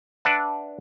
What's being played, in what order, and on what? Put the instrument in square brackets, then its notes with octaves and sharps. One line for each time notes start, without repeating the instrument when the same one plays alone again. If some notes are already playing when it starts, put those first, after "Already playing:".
[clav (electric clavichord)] D4 B4 D5 E5 F#5 A5